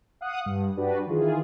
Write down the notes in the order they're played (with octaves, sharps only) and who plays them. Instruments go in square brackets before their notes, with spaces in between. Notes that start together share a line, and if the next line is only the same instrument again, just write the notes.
[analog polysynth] F5 F#5 D#6 F#6
G2
D4 F#4 G4 B4 D5
D#3 E3 F4 G#4